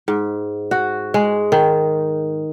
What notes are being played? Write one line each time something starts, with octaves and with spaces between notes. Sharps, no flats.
G#2
F#4
G#3
D#3